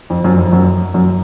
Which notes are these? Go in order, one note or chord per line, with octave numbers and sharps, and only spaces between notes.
F2
F#2
F2
F#2
F#2